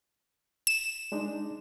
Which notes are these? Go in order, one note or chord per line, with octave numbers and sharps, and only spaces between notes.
E7
G#3 D4 D#4